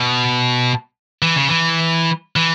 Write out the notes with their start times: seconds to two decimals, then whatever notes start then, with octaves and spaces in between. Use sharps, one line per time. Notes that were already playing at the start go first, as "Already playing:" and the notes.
Already playing: B2
1.22 E3
1.36 C#3
1.48 E3
2.36 E3